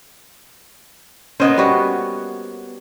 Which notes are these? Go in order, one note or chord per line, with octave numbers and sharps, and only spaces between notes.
A#3 B3 C#4 C5 D#5
G3 F#4